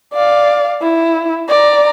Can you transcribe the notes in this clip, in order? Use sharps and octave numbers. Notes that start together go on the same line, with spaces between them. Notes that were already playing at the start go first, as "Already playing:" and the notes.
D5 F5
E4
D5 A#5